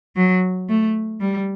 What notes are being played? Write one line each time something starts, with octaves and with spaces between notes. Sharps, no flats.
F#3
A3
G3